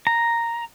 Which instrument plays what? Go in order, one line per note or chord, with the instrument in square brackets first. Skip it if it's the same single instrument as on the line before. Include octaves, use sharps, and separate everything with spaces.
[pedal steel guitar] A#5